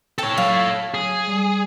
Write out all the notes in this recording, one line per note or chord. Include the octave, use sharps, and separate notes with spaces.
A4 C#5 G5
F#3 F5
G#4
G3